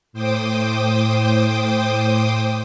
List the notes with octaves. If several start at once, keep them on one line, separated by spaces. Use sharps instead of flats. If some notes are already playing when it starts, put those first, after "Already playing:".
A2 C5 G5 D6 D#6